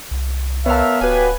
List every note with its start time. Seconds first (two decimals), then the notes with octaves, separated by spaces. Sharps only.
0.11 C2
0.66 B3 A#4 B4 C#5 E5 F5 A5 F6
1.01 D1 B3 F#4 G4 B4 G#5